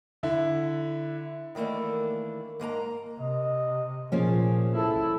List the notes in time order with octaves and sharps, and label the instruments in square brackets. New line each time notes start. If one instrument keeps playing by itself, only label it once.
[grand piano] D3 E4
[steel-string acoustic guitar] D#3 E3 A3 A#3 D4
G#2 A#3 G#5 A#5
[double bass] C3 [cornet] D#5
[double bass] A#2 [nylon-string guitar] F3 A#3 C#4 [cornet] G#4
[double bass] E4 [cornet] A4